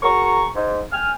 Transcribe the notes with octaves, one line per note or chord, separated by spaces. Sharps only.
F#4 G#4 A#4 A#5 C#6
G#2
G5 G#5 F6